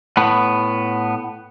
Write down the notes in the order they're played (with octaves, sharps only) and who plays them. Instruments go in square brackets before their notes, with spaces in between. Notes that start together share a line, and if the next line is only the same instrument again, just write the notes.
[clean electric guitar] A2 B3